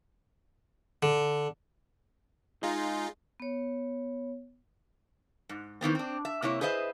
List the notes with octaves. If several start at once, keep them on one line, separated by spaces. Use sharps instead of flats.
D3
G#3 D#4 F4
B3 C#5
G#2
D#3 E3 B3 C4
C4 D4
E5
C3 A#3 E4 C#5
G#4 B4 C5 D#5 E5